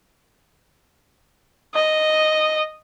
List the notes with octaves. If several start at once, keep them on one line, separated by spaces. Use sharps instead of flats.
D#5